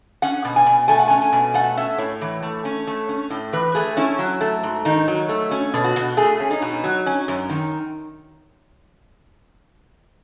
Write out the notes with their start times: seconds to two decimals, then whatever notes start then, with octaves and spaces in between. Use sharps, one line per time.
0.22 C#4 F#5
0.45 B2
0.56 G#5
0.66 B2
0.88 A3 G#5
0.99 F#5
1.08 C#4 G#5
1.21 G#5
1.33 B2
1.54 A3 F#5
1.77 C#4 E5
1.98 A2 C#5
2.21 E3
2.42 A3
2.65 C#4
2.87 A3
3.09 C#4
3.30 A2
3.53 E3 B4
3.75 A3 G#4
3.97 C#4 E4
4.19 F#3
4.41 A3
4.63 G#2
4.85 D#3 D#4
5.08 F#3
5.29 A3
5.51 C#4
5.74 B2
5.84 F#4
5.96 B2
6.17 A3 G#4
6.40 C#4
6.51 D#4
6.62 B2
6.84 F#3
7.06 C#4
7.28 F#2
7.49 D#3